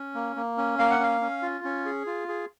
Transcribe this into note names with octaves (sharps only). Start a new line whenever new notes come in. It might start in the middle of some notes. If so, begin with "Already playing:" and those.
Already playing: C#4
A#3
A#3
C#4
A#3 F5
F#5
C#4 F5
C#4
F4
C#4
G#4
F4
G#4